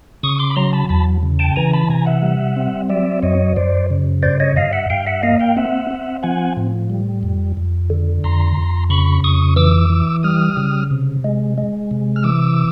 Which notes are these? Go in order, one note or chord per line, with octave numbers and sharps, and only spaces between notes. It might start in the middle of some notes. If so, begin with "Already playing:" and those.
C#3 C#6 D#6
C6 D6
B5
F#3 A#5 C6
A5 B5
E2 A5 B5
C#3
G5 A5
E3 G#5 A#5
A5 B5
C3 G#5 A#5
E5 F#5
G3
C4
F#3 D5 E5
F#2 C#5 D#5
F#2 C5 D5
C#3
G2 C5 D5
C#5 D#5
G2 D#5 F5
E5 F#5
G2 F5 G5
E5 F#5
A#3 D#5 F5
F5 G5
C4 E5 F#5
C4
F3 F#5 G#5
A2
G3
F2
F2
D3
F2 A#5 C6
F2
C#3 B5 C#6
F2 C#6 D#6
E3 D6 E6
E3
G3 D#6 F6
C#3
C3
G#3
G#3
C3
F6
E3 D6 E6